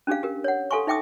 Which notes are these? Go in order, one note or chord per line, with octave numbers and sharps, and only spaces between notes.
C#4 D4 G4 G#4 F5
G4 A#4
C#5 F#5
A4 F5 G#5 C6 C#6
D#4 E5 G5 D6 D#6